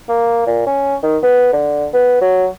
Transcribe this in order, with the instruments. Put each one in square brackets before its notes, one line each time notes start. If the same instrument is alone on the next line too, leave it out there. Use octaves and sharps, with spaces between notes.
[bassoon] A#3
A#2
C#4
D#3
B3
D3
B3
F#3